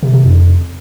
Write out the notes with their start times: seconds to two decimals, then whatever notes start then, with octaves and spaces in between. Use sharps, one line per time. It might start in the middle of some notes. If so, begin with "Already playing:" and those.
0.03 C3
0.13 C3
0.24 F2